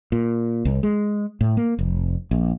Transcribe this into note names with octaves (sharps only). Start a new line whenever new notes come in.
A#2
C2
G#3
A2
A#3
F1
A#1